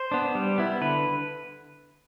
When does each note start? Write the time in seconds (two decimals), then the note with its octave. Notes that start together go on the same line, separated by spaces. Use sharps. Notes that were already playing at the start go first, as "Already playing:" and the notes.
Already playing: C5
0.11 B3 D4
0.35 G3
0.58 B3 E4
0.81 D3 B4